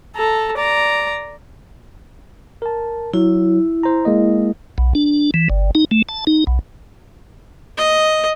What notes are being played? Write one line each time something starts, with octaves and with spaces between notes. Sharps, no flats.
A4 A#5
D5 A#5
A#4 A5
F#3 E4
C5 A#5
G#3 A#3 D#5
B1
D4
E3
G1
D#4
A3
A5
D#4
B1
D#5